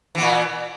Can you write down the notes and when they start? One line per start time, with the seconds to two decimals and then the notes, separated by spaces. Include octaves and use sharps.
0.15 E3
0.18 B3
0.21 A#2